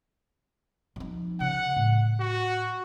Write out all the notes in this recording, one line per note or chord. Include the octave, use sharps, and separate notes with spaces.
F3 D#4
C#3 F#5
A2
F#4